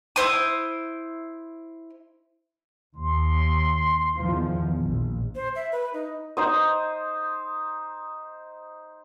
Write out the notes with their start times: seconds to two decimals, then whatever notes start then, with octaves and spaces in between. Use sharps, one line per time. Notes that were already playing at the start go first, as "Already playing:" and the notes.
0.16 E4 C5 D#6
2.96 D#2 C6
4.18 E2 D#3 F3
4.80 A#1
5.35 C5
5.56 E5
5.72 B4
5.94 D#4
6.37 D#4 C5 D#6